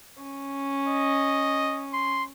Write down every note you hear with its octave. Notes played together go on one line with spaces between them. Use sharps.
C#4
D#5
C6